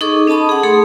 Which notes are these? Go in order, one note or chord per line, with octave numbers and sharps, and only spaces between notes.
D#4 G#4 A4 D#5 C#6 D6
C#4 D#5 A5 B5 D#6
G#4 F#5
A3 G#4 A4 C6 D#6